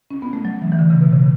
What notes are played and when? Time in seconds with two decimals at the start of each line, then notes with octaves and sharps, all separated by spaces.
0.11 C#4
0.22 B3
0.33 A3
0.45 F#3
0.62 E3
0.72 E3
0.79 D3
0.90 C#3
1.01 B2
1.12 C#3